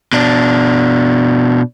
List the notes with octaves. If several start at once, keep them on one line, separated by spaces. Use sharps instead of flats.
B2 D4